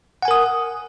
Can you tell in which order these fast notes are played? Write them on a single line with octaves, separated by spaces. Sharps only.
F#5 G#5 A#4 D#6